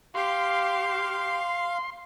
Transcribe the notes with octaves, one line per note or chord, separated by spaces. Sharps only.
G4 F5 C6